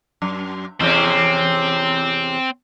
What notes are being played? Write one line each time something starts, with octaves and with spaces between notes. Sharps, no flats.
F#2
E2 C3 C4 C#4